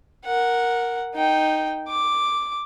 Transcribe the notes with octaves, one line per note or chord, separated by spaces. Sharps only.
A#4 F#5
D#4 G5
D6